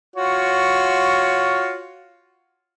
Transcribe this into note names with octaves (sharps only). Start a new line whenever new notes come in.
F4 F#4 C#5